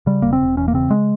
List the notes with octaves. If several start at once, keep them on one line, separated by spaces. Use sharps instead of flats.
C#3 G3
E1 A#3
C4
E1
E2 C#4
A#3
C#3 C4
G#3